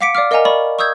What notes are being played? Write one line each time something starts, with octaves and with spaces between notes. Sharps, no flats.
F5 F#5 D6 B6 C#7 D7
D5 F5 D6 F6
A#4 D#5 F5 F#5 G#5 A#5
D5 B5 C#6
C#6 D#6 E6 G6 G#6